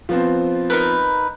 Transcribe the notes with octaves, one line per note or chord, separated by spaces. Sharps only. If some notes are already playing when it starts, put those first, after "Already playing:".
F3 B3 C4
D#4 A#4 B4